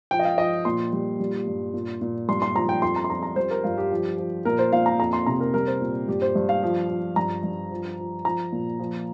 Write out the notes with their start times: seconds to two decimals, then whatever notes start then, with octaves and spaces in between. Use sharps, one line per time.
0.11 F3 G5
0.19 D#5
0.25 F5
0.38 F3 D#5
0.65 A#2 C6
0.93 G3
1.20 G3
1.47 G2
1.74 A#2
2.02 A#2
2.29 G2 C6
2.42 C6
2.55 F3 A#5
2.69 G5
2.82 F2 C6
2.96 A#5
3.04 C6
3.10 F2 A#5
3.23 A#5
3.36 G3 C5
3.51 A#4
3.64 G2 F4
3.78 G4
3.91 F3
4.18 F3
4.45 A#2 A#4
4.59 C5
4.72 A#2 F5
4.86 A#5
5.00 F2 A#5
5.13 C6
5.26 C3 A#5
5.40 A#4
5.54 G3 A#4
5.67 C5
5.81 A#2
6.08 G2 G4
6.22 C5
6.35 G2
6.49 F5
6.63 F3
6.89 F3
7.16 G2 A#5
7.43 G2
7.71 F3
7.98 F3
8.25 F3 A#5
8.52 A#2
8.79 F3